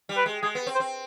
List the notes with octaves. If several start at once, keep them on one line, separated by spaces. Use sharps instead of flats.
G3
B4
G#3
G#3 G#4
B3
C4
C5
C4